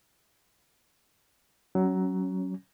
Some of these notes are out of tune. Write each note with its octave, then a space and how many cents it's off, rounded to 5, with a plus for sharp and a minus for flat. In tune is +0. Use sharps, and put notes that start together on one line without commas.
F#3 +20 C#4 +0